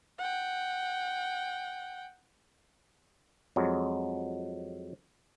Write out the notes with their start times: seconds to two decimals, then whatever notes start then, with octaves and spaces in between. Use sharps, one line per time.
0.18 F#5 G5
3.56 F2 F#3 G#3